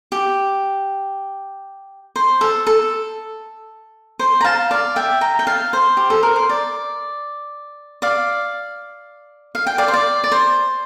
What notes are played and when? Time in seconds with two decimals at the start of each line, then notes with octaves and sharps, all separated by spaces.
0.12 G4
2.16 C5
2.41 A4
2.67 A4
4.19 C5
4.41 A#5
4.44 F5 A5
4.71 D5 F5
4.96 E5 G5
5.21 G5 A#5
5.39 G5
5.47 F5 A5
5.73 C5
5.97 G4
6.10 A4
6.23 A#4
6.36 C5
6.49 D5
8.02 D5 F5
9.55 F5
9.67 G5
9.78 D5 F5
9.88 C5
9.93 D5
10.24 D5
10.32 C5